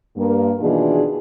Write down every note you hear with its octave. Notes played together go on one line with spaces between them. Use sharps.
G2 A#3
B2 D#3 E3 D4 F4 G#4